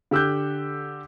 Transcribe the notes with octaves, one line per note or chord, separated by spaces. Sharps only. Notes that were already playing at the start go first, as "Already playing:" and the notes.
D3 G4 E6 F#6 G6